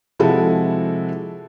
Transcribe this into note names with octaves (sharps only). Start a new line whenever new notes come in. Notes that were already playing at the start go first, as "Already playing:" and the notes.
C3 F3 G#3 E4 F#4 A4